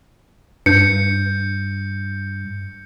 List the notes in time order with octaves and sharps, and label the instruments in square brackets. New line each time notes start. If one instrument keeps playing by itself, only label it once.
[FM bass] G2 [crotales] G6 C#7